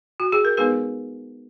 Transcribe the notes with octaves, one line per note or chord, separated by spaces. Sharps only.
F#4
G#4
A#4
G#3 B3 D#4 G#4 B4